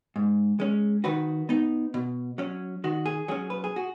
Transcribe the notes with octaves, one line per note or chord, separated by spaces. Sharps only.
G#2
G#3 C#4
D#3 F#4 B4
B3 D#4
B2
F#3 C#4
D#3 F#4
G#4
F#3 C#4 G#4
B4
G#4
F#4